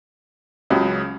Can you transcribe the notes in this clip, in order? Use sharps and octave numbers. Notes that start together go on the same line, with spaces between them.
C#2 C#3 F#3